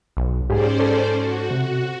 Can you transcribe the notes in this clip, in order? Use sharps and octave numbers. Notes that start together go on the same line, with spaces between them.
B1
G#2 C#4 G4 G#4 C5 D5
A4
F#4
C3